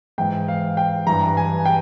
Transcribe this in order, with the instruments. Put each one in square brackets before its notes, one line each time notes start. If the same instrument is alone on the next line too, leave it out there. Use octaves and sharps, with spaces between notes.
[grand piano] G#2 E3 G5
F5
G5
G2 E3 A#5
G#5
G5